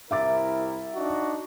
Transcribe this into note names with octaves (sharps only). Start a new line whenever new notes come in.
C2 E4 A#4 E5 D6 A6
D4 D#4 F#4